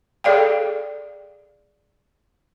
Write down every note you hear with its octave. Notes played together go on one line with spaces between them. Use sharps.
G#4 A4 D5 F5 G5